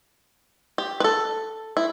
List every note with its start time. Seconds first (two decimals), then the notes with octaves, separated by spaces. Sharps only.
0.78 G4
1.00 B4
1.04 A4
1.77 E4